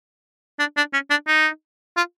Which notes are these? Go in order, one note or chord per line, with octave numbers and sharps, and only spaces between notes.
D4
D4
C#4
D4
D#4
F4